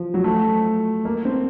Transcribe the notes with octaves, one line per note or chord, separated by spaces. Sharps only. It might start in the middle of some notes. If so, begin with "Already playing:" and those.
Already playing: F3
F#3
A3
A#3
C4